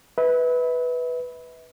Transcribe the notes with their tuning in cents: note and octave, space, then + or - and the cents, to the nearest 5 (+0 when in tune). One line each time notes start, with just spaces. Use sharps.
B4 +0 E5 -40